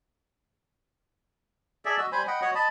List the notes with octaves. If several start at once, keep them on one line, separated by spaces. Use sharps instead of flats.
G#4 A4 D5 E5
F#4 D#5 E6
G3 C5 G#5 B5
D#5 F#5 G5 B5
F#4 C#5 D#5 F#5
D#5 A5 B5